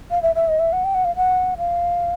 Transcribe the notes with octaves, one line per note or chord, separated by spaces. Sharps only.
F5
E5
E5
D#5
E5
F#5
G5
F#5
F5
F#5
F5